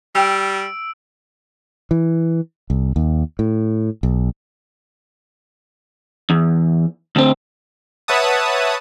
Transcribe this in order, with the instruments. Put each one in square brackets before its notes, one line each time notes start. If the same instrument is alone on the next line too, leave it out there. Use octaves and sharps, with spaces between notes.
[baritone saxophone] G3 [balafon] G5 [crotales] E6 D7
[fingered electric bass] E3
C2
D#2
A2
B1
[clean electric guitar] E2
D2 C4
[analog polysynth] B4 C#5 E5 F#5 A5 D#6